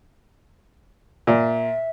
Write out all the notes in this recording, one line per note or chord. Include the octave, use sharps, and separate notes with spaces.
A#2 E5